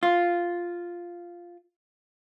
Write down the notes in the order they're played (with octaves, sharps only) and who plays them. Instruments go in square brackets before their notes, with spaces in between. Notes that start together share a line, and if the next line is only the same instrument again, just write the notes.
[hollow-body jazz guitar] F4